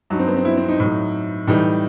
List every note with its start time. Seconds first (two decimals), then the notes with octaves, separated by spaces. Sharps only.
0.10 G2 F#3 D#4
0.19 C4
0.27 B3
0.37 C4
0.45 E4
0.57 C4
0.68 D#4
0.80 A2 F#3
1.47 A2 E3 G3 D#4